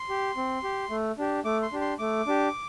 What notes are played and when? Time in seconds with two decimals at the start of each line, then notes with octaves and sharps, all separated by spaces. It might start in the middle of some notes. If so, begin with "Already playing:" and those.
Already playing: C6
0.09 G4
0.37 C4
0.63 G4
0.90 A3
1.18 D4 G4
1.45 A3 D6
1.62 C6
1.72 D4 G4
1.81 C6
1.99 A3 D6
2.27 D4 G4